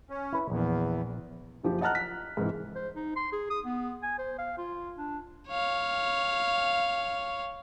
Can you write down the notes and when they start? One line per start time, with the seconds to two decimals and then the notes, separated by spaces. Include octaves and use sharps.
0.10 C#4
0.33 E4 B4
0.50 A#1 E2
1.64 F#1 F3 G4
1.81 D#5 F#5 A5 A#5 F6 F#6
1.95 B6
2.37 G#2 C3 E3
2.75 C5
2.96 D#4
3.16 C6
3.32 G#4
3.50 D#6
3.65 B3
4.03 G#5
4.18 C5
4.38 F5
4.58 F4
4.97 D4
5.49 C#5 F5